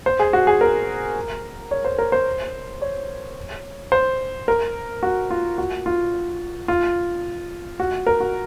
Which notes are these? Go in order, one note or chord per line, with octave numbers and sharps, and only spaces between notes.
C5
G#4
F#4
G#4
A#4
C#5
C5
A#4
C5
C#5
C5
A#4
F#4
F4
F#4
F4
F4
F#4
A#4
F#4